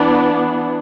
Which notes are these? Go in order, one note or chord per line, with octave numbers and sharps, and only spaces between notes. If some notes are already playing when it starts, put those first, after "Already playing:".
Already playing: E3 B3 D4 D5